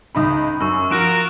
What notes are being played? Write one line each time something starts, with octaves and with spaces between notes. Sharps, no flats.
C#2 D#4 B5
F#2 C#6 E6
F3 F4 F#4 A#4 F#6 D7 E7